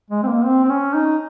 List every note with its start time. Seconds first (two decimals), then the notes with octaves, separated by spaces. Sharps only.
0.11 G#3
0.23 C4
0.27 A#3
0.45 C4
0.64 C4
0.69 C#4
0.94 D#4